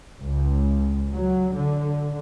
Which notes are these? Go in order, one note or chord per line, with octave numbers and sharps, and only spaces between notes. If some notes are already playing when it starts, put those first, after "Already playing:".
C#2
F#3
D3